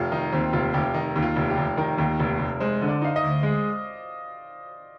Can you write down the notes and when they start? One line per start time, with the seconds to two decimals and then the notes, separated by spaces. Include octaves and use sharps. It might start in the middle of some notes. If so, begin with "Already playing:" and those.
Already playing: F1 F4 G4
0.12 D#3 D#4
0.32 D#2 C4
0.53 F1 F4
0.74 F1 G4
0.94 D#3 D#4
1.16 D#2
1.22 F4
1.36 F1
1.50 G4
1.57 F1
1.77 D#3 A#4
1.98 D#2
2.20 F1
2.39 F1
2.60 G#3 C5
2.82 D3
2.88 D5
3.02 D#4 F5
3.16 D#5
3.23 D2
3.43 G#3